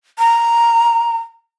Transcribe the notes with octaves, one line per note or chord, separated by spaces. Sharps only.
A#5